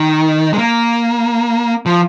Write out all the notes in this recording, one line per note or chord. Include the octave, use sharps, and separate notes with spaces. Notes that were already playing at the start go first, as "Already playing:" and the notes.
Already playing: D#3
G#3
A#3
F3